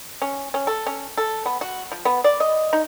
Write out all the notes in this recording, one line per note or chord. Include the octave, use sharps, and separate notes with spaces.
C#4
C#4
A4
C#4
A4
B3
F#4
F3
B3
D5
D#5
D#4